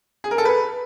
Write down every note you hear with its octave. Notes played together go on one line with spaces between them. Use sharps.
G#4
A#4
A4
B4